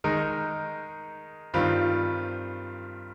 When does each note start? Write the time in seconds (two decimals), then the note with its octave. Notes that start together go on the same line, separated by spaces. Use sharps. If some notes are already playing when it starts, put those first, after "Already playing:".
0.04 D#3 G#3 D#4 A#4
1.54 G2 D#3 G3 C4 F4